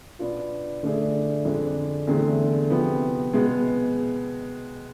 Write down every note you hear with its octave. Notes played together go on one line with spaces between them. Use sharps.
B2 B3 D4 F4
D3 A3 D4 G#4
F2 D3 G#3 D4
E2 D3 A3 C4 G#4
C3 F3 B3
B2 G#3 B3